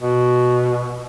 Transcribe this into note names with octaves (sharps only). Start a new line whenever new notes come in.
B2